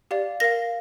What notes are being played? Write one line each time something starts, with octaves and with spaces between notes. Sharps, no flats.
G4 D5 F5
A#4 F5 A#6